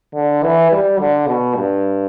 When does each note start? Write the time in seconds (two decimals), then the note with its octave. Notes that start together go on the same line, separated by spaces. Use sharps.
0.14 D3
0.43 E3
0.71 G3
0.99 D3
1.27 B2
1.55 G2